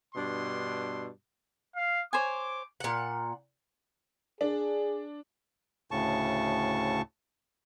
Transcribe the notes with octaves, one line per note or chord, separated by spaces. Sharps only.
G2 B2 D4 C6
F5
C5 C#5 G#5 D6
A#2 F#5
D4 G#4
D2 A2 C#3 A5 C#6